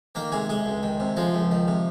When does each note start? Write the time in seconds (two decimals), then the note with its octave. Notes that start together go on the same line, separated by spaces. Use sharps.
0.15 D#3 A#3 A#4
0.32 C3 G#3 G#4
0.49 G#3 G#4
0.66 C#2
0.83 D#3
1.00 C3
1.17 F3 G#3 F4
1.34 C#2
1.51 D#3
1.68 C3